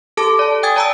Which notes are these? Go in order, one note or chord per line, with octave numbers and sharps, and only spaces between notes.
G4 A4 A5 D6
D5 A5
G5 G#5 D#6 G#6 A6
D5 A5 A#5 D#6 E6